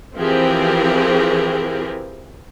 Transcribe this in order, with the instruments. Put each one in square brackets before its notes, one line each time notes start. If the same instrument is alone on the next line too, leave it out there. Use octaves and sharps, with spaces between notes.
[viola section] E3 F3 C4 G4 G#4 A#4